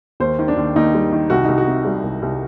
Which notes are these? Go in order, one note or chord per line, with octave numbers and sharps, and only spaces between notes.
D#2 C5
D#3
D4
D#2
D#2 D#4
G3
D#3
C2 F#4
C2 D#4
F#4
C3
G3
C2
C2